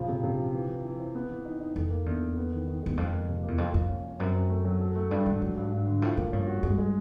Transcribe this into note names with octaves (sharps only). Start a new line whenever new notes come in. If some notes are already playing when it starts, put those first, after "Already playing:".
Already playing: A#2 C#3 F3
C3
C3
F3
E3
E3
E3
C4
B3
E3
D#4
D#4
F2 A4
A#3
E2 D4
A4
B3
D#3
D#3
E2 G#3
F2 F3
A#3
C3
E2 A#3
F2 F4
F2 F4
C#4
C#4
F#2 C4
C4
A3
F#3
A4
A3
G2 D4
G#2 D4
G#2 F#3
G2
G2
D3
A2 F3
A2 A#3
G2 C#4
F#4
G2 G#3
G#3